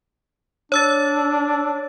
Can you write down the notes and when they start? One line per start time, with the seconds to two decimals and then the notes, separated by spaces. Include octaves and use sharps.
0.72 D4 C#5 E6 A6